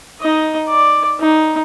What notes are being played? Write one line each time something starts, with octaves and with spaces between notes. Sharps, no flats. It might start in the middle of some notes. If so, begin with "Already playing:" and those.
D#4 D#5
D5
D#4